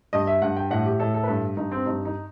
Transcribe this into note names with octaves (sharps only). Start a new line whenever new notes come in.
G2 D#5
E5
G2 F#5
G5
A2 F#5
G4
A2 A4
A4
B4
G2 A4
G2 D#4
C4
G2 D#4
D#4